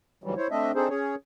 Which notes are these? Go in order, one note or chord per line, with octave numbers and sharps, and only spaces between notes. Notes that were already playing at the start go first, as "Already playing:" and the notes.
D2 G#2 E3 F#3 G3
E4 C5 C#5
A3 C4 D4 D#5 E5
C4 D4 D#4 G#4 A4 C5
C#4 G#4 C#5